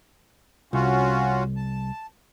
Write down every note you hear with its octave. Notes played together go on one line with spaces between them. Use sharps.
C2 C#4 F4 F#4
A5